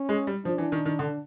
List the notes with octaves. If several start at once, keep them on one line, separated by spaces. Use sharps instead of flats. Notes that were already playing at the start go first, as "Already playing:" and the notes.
Already playing: C#4
G#3
G3
F3 D4
E3
D#3
D#3
D3